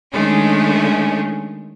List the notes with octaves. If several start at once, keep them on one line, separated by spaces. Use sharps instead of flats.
D#3 G#3 A3 C#4 D4